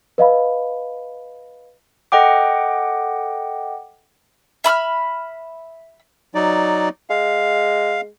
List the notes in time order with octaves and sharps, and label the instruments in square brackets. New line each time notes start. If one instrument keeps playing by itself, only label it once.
[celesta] B4 D#5 F5 B5
[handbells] A4 D#5 F#5 G5 D6
[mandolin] E5 B5 E6 F6
[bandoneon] F#3 D#4 D5
[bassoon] G#3 [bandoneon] F5